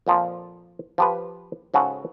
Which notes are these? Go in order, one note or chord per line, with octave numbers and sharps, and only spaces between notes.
F2 A#2 F3
F3 G4 B4
G#2 C#3 F#4 A4 F#5